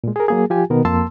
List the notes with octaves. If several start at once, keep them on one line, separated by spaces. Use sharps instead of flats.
A#2 G#3
G#4 A#4
F#3 A#3 G#4
F3 F4 G4 G#5
B2 D#3 B3 A#4
F2 A#3 A5 C6 E6